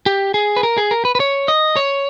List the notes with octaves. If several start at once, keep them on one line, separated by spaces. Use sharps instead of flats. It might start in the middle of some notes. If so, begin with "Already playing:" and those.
G4
G#4
B4
A#4
G#4
A#4
B4
B4
C#5
D#5
C#5